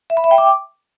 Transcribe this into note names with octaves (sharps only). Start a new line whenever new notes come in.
E5
B5
E5
G5
D6